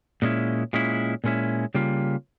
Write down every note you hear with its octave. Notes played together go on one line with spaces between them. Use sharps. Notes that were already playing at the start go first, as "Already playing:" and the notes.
A#2 G#3 C#4 E4
A#2 G#3 C#4 E4
A#2 G#3 C#4 E4
C#3 G3 A#3 F4